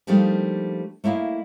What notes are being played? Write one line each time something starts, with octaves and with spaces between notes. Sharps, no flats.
F3 G3 A3 A#3 D4 D#4
A3 A#3 E4 D#5 F5